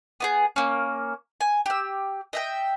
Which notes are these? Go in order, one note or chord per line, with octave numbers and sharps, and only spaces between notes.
B3 E4 G#4
A#3 C#4
G#5
G4 E6
D#5 E5 G5